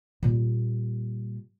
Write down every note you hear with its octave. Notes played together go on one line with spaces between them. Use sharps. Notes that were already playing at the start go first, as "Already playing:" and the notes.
A#2 G3